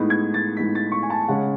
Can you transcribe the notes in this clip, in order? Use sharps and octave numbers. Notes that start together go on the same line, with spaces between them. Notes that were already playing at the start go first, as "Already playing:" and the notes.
Already playing: A2 G#3 B3 D#4
G#6
A6
A2 G#3 B3 D#4 B6
A6
C#6
G#5
A5
C#3 G#3 C#4 F#5